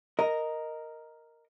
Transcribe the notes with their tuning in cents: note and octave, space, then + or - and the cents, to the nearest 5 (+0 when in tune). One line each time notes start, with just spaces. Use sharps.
A#4 +0 D#5 +0